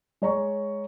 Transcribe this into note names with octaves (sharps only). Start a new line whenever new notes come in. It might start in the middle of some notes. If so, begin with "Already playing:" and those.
G#3 C#5 A#5 C#6